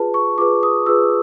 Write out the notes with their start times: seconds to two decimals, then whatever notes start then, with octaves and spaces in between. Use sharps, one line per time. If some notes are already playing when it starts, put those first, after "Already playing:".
Already playing: F4 G#4 B4 A5
0.14 C#6
0.38 F4 G#4 B4 D6
0.63 D#6
0.86 F4 G#4 B4 E6